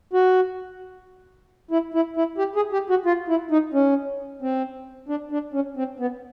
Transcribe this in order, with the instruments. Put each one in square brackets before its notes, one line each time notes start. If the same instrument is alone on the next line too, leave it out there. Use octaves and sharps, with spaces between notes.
[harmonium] F#4
E4
E4
E4
G4
G#4
G4
F#4
F4
E4
D#4
C#4
C4
D4
D4
C#4
C4
B3